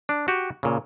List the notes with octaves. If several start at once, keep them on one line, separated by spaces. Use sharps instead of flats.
D4
F#4 G4 G5
A#2 C#3